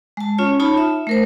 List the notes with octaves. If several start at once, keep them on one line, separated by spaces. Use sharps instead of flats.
G#3 A5
C#4 F4 C#5
D#4 F4 C#5 A5 B5
E5
A3 A#4 C5